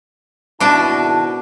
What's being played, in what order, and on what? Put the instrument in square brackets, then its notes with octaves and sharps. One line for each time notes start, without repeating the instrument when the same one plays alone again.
[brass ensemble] G#1 E4 A5 [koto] B2 D4